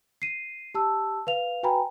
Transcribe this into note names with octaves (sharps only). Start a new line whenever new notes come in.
C7 D#7
G4 A5 E6
B4 F5 F7
F#4 B4 G5 G#5 A#5 B5